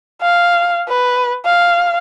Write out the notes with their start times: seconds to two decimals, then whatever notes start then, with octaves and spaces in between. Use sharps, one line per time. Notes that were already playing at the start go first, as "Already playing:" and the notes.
0.22 F5
0.89 B4
1.45 F5